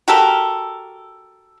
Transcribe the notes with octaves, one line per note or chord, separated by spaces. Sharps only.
F#4 G4 A4 A#4